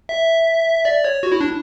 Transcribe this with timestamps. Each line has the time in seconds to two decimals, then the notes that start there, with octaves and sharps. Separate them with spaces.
0.09 E5
0.85 D5
1.04 C#5
1.23 F#4
1.32 E4
1.41 D4